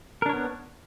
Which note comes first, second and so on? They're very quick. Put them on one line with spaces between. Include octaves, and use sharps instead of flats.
A#4 D4 C#5 B3